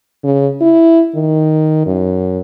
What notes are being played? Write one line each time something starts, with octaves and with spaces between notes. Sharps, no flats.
C#3
E4
D#3
F#2